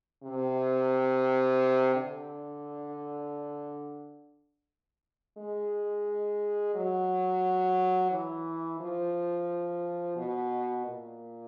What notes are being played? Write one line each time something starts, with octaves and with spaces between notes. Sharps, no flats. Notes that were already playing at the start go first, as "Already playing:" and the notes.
C3
D3
G#3
F#3
E3
F3
B2
A#2